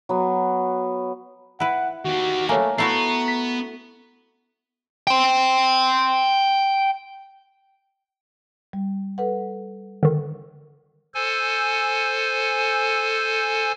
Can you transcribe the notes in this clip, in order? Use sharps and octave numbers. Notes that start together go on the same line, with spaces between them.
F#3 B3
E4 B4 F#5
D#3 F#4 G4
A3 A#3 C#5 G#5
A3 B3 E4 F#4 A#5 C7
B6
G5 C6
G3
A4 B4 F#5
D3 D#3
A4 C5 G#5